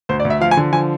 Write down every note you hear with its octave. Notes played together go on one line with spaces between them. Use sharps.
D2 C5
D5
D2
E5
F3 F5
G#5
D3
F3 G#5